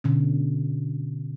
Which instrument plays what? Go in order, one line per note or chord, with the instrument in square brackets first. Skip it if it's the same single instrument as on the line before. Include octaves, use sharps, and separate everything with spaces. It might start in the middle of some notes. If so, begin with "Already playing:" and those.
[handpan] B2 D3 C#4